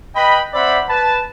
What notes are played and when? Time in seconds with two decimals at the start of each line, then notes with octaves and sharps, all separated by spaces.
0.15 B4 D#5 G5 B5
0.53 C4 C5 D5 E5 F#5 B5
0.88 B4 A5